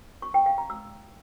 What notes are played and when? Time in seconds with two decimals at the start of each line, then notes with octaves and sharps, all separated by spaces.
0.22 C#6
0.34 G5
0.46 F5
0.58 A#5
0.70 E6